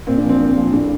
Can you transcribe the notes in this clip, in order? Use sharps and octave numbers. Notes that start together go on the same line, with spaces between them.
A#2 C4
D4
F3
C4
A#2
F3
A2 D4